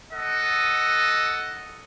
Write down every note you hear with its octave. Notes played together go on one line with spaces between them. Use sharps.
A4 D#5 F#5